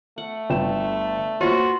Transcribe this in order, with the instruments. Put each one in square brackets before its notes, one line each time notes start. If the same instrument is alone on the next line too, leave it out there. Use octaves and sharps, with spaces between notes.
[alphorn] A3 [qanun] F#5
[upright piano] G1 G5 E7
[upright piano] A#3 C5 C#5 [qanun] B3 F4 [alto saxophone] F#4